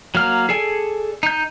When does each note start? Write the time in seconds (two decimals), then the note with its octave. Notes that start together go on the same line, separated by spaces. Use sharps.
0.15 F#3 A#3 F6
0.49 G#4 A4 D5 G#5
1.23 D#4 G6